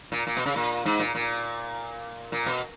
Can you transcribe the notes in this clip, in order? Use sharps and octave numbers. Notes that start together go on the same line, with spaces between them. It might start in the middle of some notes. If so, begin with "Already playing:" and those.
A#2
A#2
B2
C#3
A#2
G#2
A#2
A#2
A#2
B2